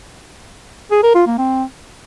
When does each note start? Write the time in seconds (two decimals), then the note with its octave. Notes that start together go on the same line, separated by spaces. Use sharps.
0.91 G#4
1.03 A#4
1.15 F4
1.26 A#3
1.38 C4